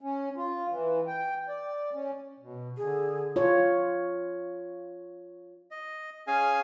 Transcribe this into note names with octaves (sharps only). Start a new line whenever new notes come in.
C#4
F4
E3
G5
D5
C#4
B2
D3 G#4
F4 C#5
D#5
C#4 G#4 F5 G#5